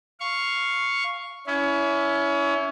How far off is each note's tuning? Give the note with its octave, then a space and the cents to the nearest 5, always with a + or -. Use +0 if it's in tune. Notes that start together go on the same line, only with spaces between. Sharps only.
F5 +0 C#6 +0
C#4 +25 E4 +0